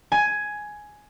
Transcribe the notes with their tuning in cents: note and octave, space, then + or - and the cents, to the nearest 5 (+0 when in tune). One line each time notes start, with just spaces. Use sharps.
G#5 +10